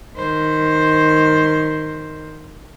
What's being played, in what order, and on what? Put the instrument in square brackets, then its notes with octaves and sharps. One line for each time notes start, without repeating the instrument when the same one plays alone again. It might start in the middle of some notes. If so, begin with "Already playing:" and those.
[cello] D#3 C5